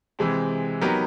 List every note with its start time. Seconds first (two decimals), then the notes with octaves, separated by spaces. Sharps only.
0.19 C3 E3 G#3 C4
0.81 F#3 B3 D#4 G4 A#4